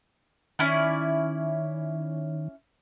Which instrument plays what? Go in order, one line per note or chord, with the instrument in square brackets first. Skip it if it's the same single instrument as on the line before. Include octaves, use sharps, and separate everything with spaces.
[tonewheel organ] D#3 [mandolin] C#4 E4 D5